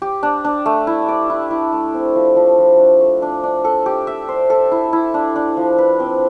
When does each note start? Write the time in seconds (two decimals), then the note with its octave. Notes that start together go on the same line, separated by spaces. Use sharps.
0.02 G4
0.23 D4
0.44 D4
0.66 A3
0.87 E4
1.08 D5
1.30 E4
1.51 E4
1.73 A3
1.94 C4
2.15 F3
2.36 F3
2.58 F3
2.79 D4
3.01 A3
3.22 D4
3.44 D4
3.64 A4
3.86 G4
4.07 E5
4.29 C5
4.50 A4
4.72 E4
4.93 E4
5.14 D4
5.36 D4
5.57 F3
5.78 B4
6.00 C4